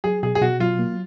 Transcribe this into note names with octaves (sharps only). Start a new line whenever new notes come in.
F#3 G#4
B2 G#4
G#4
B2 F#4
F#3 F4
A#3